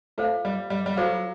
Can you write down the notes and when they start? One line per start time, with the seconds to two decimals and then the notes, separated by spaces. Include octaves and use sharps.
0.18 A3 F4 A4 C5 F5
0.45 G3
0.70 G3
0.86 G3
0.97 F#3 F4 A4 C5 F5